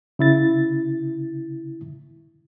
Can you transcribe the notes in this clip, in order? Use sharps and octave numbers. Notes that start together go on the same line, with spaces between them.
C#3 E4 A6